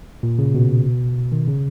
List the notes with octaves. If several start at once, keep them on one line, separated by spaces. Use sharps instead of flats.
A#2
C#3
B2
D#3
C#3